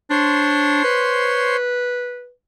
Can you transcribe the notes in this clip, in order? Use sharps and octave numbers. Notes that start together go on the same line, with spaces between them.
D4 C5 C#5 C6
B4